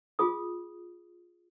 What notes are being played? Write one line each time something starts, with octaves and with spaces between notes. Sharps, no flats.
F4 G#4 D#6